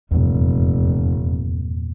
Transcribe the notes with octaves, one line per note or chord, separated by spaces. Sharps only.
F1 E2 G2 A#2